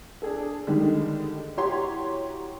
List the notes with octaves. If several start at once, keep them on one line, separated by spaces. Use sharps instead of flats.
D4 G#4 A4
D3 D#3 G3 G#3
E4 F#4 G4 C#5 A#5 C6